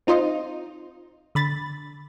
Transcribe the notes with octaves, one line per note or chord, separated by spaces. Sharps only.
C4 D#4 F4 C5 D#5
D3 B5 A6